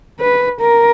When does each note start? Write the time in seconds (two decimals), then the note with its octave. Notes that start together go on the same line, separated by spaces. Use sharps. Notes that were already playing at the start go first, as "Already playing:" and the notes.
0.20 B4
0.60 A#4